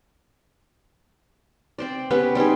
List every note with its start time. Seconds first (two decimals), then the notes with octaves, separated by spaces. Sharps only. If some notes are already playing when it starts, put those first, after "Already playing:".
1.78 C4 C5 D5
2.10 B3 C#4 G4 B4
2.35 G3 C4 D#4 G#4